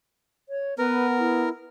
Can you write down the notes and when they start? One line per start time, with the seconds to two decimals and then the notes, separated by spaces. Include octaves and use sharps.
0.49 C#5
0.78 B3 A#4 B4
1.19 E4